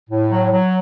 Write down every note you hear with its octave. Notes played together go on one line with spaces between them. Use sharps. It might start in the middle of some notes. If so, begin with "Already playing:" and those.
A2
F#3
F#3